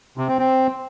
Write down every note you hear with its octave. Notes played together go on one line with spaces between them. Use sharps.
C3
C4
C4